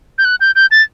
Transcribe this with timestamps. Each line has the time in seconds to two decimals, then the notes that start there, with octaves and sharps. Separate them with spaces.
0.18 G6
0.25 F#6
0.40 G6
0.55 G6
0.71 A6